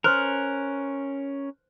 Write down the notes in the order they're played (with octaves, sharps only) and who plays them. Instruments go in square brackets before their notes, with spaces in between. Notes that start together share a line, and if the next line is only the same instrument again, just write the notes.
[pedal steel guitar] C#4 A#4 [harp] C5 F6 F#6